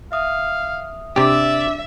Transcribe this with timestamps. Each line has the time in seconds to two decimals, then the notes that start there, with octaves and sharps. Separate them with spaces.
0.12 E5 F5 D#6
1.16 C3 D4 G4 D5 E5 D6 E6